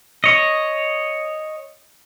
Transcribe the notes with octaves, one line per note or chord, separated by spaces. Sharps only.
C#5 D#5